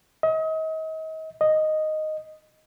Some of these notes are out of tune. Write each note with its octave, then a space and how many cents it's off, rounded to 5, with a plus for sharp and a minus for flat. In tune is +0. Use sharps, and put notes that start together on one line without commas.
D#5 +35
D#5 -5